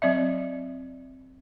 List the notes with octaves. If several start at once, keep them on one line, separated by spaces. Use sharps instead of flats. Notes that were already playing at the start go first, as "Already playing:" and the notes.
F#3 C4 D5 E5